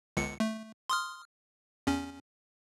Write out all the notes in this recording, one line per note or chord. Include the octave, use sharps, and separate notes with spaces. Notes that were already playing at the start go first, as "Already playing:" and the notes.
G1 C#2 C#7
A3
C6 D#6 F6
E2 C#4